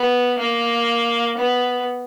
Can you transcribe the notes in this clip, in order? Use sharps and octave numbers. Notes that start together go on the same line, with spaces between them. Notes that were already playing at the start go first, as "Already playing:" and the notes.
Already playing: B3
A#3
B3